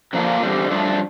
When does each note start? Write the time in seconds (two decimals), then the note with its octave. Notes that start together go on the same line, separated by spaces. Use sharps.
0.13 D3 F3 A#3 D4 F4
0.42 E2 D3 G3 C4
0.71 G2 F3 A3 D4